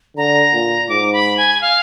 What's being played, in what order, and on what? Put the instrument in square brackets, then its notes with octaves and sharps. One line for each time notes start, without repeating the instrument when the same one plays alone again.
[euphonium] D3 [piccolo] A#5
[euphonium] A#2
[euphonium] G#2 [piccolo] D6
[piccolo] B5
G#5
F5